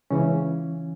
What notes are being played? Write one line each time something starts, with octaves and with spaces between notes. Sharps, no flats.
C#2 C#3 E3 C#4